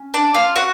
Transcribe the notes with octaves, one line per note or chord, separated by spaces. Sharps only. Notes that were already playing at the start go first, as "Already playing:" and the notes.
Already playing: C#4
D4 D5
F4 F5
F#4 F#5